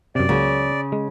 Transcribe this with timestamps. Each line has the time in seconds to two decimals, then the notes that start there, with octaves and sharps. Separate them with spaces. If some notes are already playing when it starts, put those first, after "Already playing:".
0.15 F#2 C3 D5
0.29 C#2 C#3 F#3 A#3
0.92 G#3